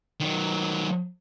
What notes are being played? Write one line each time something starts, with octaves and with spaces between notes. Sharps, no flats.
D#3 F#3